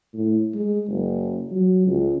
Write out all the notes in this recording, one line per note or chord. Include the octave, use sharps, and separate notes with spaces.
A2
G#3
F#1
F#3
C#2